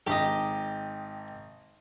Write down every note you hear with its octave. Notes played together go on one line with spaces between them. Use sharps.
G#1 D#4 G4 D#5